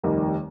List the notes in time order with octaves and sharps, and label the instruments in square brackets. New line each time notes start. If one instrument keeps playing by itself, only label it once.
[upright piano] F1 D#2 D#3 G3